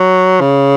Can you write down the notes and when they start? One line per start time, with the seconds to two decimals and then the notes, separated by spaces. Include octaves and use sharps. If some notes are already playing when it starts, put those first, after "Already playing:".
Already playing: F#3
0.41 C#3